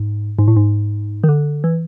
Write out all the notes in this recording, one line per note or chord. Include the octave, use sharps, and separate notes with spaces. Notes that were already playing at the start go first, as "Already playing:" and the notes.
Already playing: G#2
G#2
A2
G#2
D#3
D3
E3